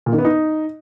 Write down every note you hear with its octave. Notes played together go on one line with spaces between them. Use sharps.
A#2
D#3
B3
D#4